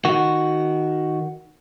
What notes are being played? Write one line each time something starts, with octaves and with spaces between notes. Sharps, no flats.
D#3 F#4